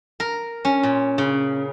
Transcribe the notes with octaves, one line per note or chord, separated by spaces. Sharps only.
A#4
C#4
A#2
C#3